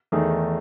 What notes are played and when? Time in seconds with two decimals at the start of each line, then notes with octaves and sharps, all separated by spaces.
0.12 E2 D#3 A3 D#4 G#4